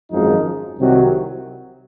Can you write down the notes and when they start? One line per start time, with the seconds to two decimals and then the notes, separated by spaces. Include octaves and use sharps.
0.11 G#1 F#2 F3 G#3 D#4
0.78 C2 C3 D#3 F#3